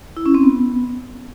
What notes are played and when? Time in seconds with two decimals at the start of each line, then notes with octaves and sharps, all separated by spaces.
0.17 E4
0.26 C#4
0.34 C4
0.43 B3